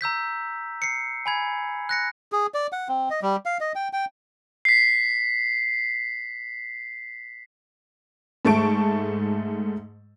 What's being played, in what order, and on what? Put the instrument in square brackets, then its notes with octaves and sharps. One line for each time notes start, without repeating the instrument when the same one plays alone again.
[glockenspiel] A#5 E6 G6 B6
C7 C#7
G#5 B5 G#6
F#6 A#6 C#7
[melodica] G#4
D5
F#5
C4
D#5
G3
F5
D#5
G5
G5
[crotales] B6 C7
[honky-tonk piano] G#2 A3 A5 C#6 D7